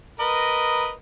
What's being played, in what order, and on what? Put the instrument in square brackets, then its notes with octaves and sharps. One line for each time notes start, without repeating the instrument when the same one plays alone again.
[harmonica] A#4 B4 D#5